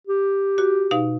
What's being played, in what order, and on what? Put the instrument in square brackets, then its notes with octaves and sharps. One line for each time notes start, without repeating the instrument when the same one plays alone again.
[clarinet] G4
[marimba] F#4
B2 D#4 F5